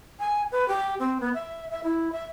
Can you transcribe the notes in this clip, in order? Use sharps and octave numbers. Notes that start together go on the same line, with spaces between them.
G#5
B4
G4
C4
B3
E5
E5
E4
E5